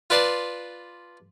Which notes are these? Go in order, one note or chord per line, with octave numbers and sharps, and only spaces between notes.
F4 B4 D5 A5 C6